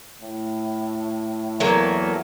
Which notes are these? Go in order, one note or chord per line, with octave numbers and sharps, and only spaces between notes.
A2
E2 F#3 A3 A#3